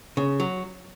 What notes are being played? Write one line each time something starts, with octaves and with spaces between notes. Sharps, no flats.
C#3
F#3